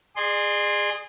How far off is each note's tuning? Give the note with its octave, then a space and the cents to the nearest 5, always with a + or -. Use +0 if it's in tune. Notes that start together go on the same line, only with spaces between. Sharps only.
G#4 -10 D5 +45 C6 +0